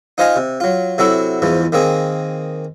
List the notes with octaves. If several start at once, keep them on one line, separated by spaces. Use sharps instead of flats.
D#4 F4 C5 D#5 F5 G#5
C3
F#3 F4
C3 F#3 E4 F#4 A4
E2 G#2 E3 F3
D#3 A#3 C4 G#4